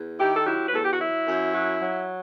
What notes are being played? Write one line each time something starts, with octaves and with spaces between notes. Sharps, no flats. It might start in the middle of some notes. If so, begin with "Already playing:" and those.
Already playing: E2
D#3 E4 G4
A4
F#3 E4 G4
B4
E2 A4
G4
F#4
F#3 E4
F#2
F#3
F#3